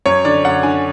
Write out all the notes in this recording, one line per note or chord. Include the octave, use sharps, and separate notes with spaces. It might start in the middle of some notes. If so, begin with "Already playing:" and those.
F#2 C#5
D3 D5
F#2 F#5
D3 G#5